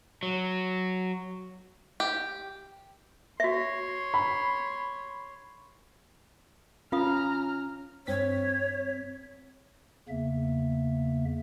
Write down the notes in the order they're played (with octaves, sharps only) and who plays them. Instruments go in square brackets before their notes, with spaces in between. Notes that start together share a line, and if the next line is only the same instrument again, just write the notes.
[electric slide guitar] F#3
[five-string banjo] G4
[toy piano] F#4 E5 [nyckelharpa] C#5 C6
[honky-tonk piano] B5
[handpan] C#4 [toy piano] F4 F5 D#6 [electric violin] A#5 F6
[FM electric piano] G2 C4 B6 [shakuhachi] C#5
[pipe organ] E2 C#3 A#3 E5